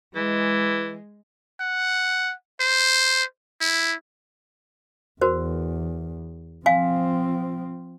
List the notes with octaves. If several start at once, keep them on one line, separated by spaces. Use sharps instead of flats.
E3 G#3
F#5
C5
E4
E2 F#4 A#4 C5
F3 C4 F5 G#5